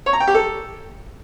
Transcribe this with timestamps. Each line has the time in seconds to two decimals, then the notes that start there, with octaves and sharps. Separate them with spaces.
0.06 C#5
0.13 A#5
0.20 G5
0.27 G4
0.35 A4